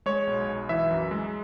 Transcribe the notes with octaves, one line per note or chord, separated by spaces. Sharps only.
G#3 C#5
B1
B1
E3 E5
F#2
G#3